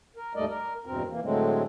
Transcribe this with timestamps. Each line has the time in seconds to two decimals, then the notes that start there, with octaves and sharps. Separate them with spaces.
0.17 A#4
0.35 D#2 G#2 G3 A3 D5 D#5
0.49 A#4
0.86 E2 G2 B2 C4 A#4
1.09 E3 A#3
1.22 A2 D3 F#3 G#3 A3 C4